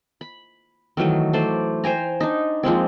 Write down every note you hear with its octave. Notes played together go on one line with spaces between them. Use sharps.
B5
D#3 E3 F#3 A3
A3 C5 D5
C5 G5 G#5 A#5
D4 D#4
F3 G#3 A#3 C4